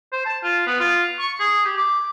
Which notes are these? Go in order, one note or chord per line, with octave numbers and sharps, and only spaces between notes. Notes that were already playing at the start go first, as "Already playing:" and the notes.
C5
A5
F4
B3
F4
C#6
G#4
G4
D6